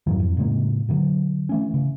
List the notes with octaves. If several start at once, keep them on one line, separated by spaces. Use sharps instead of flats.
F2 G#2 E3 F#3
F2
A2 C#3 G#3 A#3
B2 D3 F#3
E3 A3 C#4
C#3